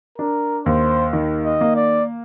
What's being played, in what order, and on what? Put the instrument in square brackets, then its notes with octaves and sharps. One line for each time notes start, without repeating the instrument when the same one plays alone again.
[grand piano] D4 [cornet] A#4
[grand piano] D#2 [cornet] C5
[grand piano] D#3
[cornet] D#5
[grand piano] A#3
[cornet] D5